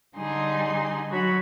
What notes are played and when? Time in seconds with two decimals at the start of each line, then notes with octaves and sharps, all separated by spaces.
0.16 D3 G3 D#4 G#4 C6
1.09 D3 F#3 F#4 C#5 B5